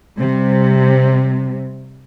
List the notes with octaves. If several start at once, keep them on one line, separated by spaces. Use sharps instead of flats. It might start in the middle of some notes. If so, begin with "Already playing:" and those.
C3 G3